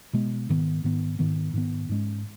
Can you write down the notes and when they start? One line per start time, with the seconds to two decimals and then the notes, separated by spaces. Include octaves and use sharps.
0.13 B2 G#3 B3
0.49 G#2 D#3 B3
0.84 G#2 D#3 B3
1.19 G#2 D#3 B3
1.53 G#2 D#3 B3
1.89 G#2 G#3 C#4